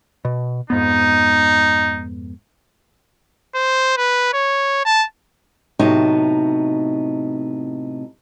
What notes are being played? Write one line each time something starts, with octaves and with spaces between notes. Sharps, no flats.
B2
F2 G#2 B3 D#4
C5
B4
C#5
A5
A2 C3 F#3 B3 D#4 A5